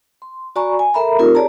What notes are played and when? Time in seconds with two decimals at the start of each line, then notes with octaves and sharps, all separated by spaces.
0.22 C6
0.56 F#4 D5 G#5 A#5 B5 C#6
0.79 G#5
0.94 A4 A#4 E5 A#5 B5
1.18 A3 C4 D#4 F4 G4 A#4
1.35 G4 G#4 C#5 D5 A5 A#5